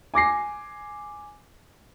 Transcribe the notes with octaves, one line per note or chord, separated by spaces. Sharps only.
G#5 D6 A#6 C7